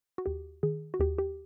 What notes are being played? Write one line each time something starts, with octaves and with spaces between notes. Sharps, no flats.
F#4
D#2 G4
D#3 G#4
F#4
D#2 G4
G4